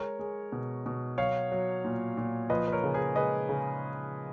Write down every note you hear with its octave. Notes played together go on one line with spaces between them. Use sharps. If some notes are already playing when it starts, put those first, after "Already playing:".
Already playing: G#3 A#4 C#5
G#3
B2
B2
F#3 C#5 F5
F#3
A#2
A#2
F3 B4 D#5
B4
A#4 C#5
C#3
G#4 B4
G#3 B4 D#5
C#3